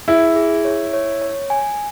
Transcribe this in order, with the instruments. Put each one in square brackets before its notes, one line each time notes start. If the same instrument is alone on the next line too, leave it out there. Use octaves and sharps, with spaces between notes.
[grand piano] E4 [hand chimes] G#4
[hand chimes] G#4
C#5
C#5
C#5
G#5